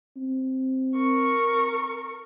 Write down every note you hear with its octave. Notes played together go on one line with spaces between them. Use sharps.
C4
A#4 C#6